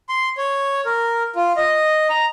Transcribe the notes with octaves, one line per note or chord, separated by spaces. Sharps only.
C6
C#5
A#4
F4
D#5
A#5